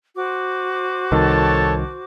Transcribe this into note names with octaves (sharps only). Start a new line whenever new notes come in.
F#4 C5 D6
C2 D#3 A4 C#5 A5